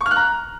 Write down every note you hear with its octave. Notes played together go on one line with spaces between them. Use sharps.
C#6
F6
F#6
A#5